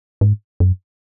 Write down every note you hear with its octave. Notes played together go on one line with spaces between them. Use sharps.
G#2
F#2